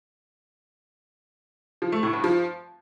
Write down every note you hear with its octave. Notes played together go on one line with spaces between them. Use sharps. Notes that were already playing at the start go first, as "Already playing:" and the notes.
F3
A3
A2
G2
F3